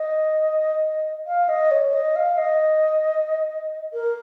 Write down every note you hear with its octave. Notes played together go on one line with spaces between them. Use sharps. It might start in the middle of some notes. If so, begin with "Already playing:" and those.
Already playing: D#5
F5
D#5
C#5
D#5
F5
D#5
A#4